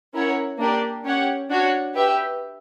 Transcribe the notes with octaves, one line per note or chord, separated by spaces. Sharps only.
C#4 E4 A#4 C#5 F#5
A#3 D4 G4 A#4 D5
C#4 G4 C#5 F#5
D4 F#4 C#5
G4 B4 E5 G5